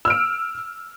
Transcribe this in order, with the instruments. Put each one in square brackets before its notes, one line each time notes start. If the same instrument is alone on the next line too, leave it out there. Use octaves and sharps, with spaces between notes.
[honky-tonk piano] E6
F6
D7